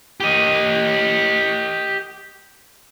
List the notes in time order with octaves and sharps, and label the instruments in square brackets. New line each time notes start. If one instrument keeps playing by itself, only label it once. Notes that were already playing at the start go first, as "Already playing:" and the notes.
[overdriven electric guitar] G4 D#5